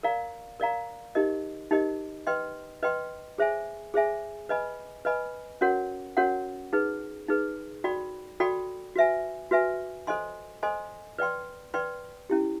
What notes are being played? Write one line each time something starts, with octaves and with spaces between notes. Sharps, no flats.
A#4 D5 F5 A#5
A#4 D5 F5 A#5
D#4 G4 A#4 D#5
D#4 G4 A#4 D#5
B4 D#5 G5 C6
B4 D#5 G5 C6
G#4 C5 E5 G#5
G#4 C5 E5 G#5
B4 D#5 G#5 B5
B4 D#5 G#5 B5
C#4 F#4 A#4 C#5 F#5
C#4 F#4 A#4 C#5 F#5
D#4 G#4 B4
D#4 G#4 B4
F#4 A4 D5 G5 B5
F#4 A4 D5 G5 B5
F#4 B4 E5 G#5
F#4 B4 E5 G#5
A4 C5 D#5 G#5 C6
A4 C5 D#5 G#5 C6
B4 D5 G5 C6
B4 D5 G5 C6
C#4 E4 G4